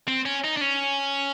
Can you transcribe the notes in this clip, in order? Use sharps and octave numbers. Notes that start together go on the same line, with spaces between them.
C4
C#4
D#4
D4
C#4